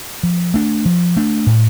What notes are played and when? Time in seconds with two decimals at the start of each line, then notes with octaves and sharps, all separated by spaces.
0.23 F3
0.54 A3 D4
0.85 F3
1.17 A3 D4
1.46 A2